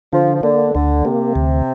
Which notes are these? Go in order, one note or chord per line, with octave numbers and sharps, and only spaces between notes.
D3 F3
F3
D3 A#3
D2 D3
C3 A#3
D2